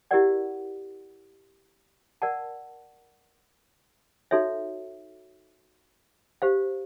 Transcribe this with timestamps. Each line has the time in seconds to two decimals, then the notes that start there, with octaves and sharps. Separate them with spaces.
0.11 E4 G4 A#4 D5 F#5
2.22 A#4 D5 F#5 A5
4.31 D#4 F#4 A4 C#5 E5
6.42 G4 C5 F5